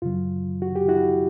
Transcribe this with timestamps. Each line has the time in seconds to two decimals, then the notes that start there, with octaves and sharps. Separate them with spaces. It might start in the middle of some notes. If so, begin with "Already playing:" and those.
0.02 F#2 C#3 F#3 F4
0.62 F#4
0.76 G4
0.88 E4 F#4